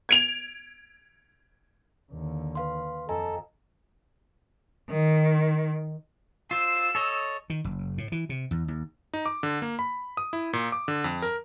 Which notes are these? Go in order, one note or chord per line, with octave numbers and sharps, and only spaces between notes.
G#6 D7 F7
D#2 D3
B4 F5 C6
F2 A4 D#5 G#5 A#5
D#3
F4 C5 E6
A4 C#5 D#5
D#3
F#1
A2
E3
C3
E2
D#2
D#4
D6
D3
A#3
B5
D#6
E4
A#2
D6
D3
F2
A#4